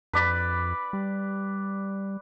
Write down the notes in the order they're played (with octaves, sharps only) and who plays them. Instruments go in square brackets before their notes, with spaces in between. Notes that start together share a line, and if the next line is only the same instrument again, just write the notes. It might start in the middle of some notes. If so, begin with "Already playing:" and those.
[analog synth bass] F2 [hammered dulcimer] B4 D5 B5
[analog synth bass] G3